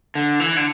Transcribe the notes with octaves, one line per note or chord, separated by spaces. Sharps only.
D3
E3
D3